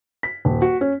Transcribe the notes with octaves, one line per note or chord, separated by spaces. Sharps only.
B6
D#1
F#4
C#4